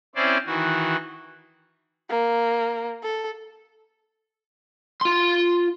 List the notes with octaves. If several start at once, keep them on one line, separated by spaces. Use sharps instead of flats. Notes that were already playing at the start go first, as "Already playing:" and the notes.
C4 C#4 E4 C5 D5
D#3 E3 F#4
A#3
A4
F4 C6